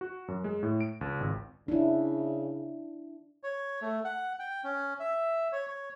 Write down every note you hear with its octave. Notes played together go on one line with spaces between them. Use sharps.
F#4
F#2
G#3
A2
D7
C#2
G#1
C#3 D4 E4
C#5
A3
F#5
G5
C#4
E5
C#5
C#5